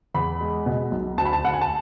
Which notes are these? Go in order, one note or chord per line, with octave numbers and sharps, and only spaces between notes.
E2 B5
G#3
B2
B1
D2 A5
B5
A5
D2 F#5
G#5
A5